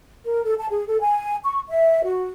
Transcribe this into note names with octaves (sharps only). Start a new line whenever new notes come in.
A#4
A4
A5
G#4
A4
G#5
C#6
E5
F#4